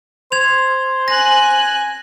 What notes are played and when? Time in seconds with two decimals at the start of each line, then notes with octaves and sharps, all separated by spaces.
0.32 C5 G#6 F7
1.08 G#5 F#6 A#6